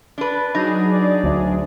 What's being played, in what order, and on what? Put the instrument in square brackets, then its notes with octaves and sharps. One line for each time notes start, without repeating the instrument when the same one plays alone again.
[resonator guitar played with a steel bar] D4 B4
[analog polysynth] F#3 D4 G#4 [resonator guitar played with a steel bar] D#4
[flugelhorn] D5
[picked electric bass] D2